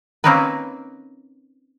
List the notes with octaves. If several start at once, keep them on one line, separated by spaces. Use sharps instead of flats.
A#3 C4 C#4 D#4 A#4 B4